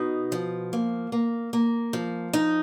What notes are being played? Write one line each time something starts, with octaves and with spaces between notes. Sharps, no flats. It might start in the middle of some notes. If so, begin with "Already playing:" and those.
Already playing: B2 D#4
F3
A#3
A#3
A#3
F3
D#4